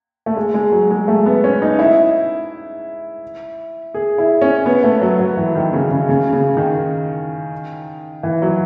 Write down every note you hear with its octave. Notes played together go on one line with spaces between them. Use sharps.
A3
G#3
G#3
F#3
G#3
A3
B3
C#4
D#4
E4
G#4
E4
C#4
B3
A3
F#3
F#3
E3
D#3
C#3
C#3
C#3
C#3
D#3
E3
F#3